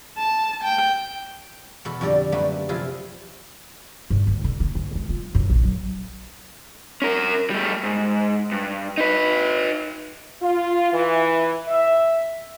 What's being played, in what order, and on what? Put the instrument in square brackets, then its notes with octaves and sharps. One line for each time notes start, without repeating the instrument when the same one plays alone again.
[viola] A5
G5
[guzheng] E2 B2 A4 B5
F2 D3 G3 A4 D5 A#5
F#2 G3 A3 A#3 B4 B5
C3 F3 E4 F4 G#4
[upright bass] G2
D2
D3
A#3
D2
G#3
F4
F#2
A#1
F#3
[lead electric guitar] C#4 A#4
G3 A3
G#2
G2
D#4 B4
[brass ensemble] F4
E3
E5